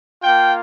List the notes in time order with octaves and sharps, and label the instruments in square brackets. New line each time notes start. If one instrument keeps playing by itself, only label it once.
[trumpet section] A#3 F4 G5